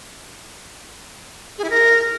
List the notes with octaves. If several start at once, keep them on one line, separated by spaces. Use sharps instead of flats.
G#4
E4
A#4